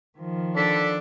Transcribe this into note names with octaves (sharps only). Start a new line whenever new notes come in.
D#3 F3
D4 A4 B6